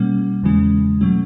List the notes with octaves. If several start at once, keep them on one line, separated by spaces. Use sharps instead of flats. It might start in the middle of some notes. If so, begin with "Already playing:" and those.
Already playing: B2 G3 A#3 C#4
E2 C#3 E3 G#3 C#4
B2 F#3 A3 C#4